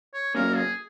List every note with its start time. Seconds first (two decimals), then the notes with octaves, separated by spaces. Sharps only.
0.14 C#5
0.35 C#3 F#3 A#3 C#4 A#4
0.56 G#4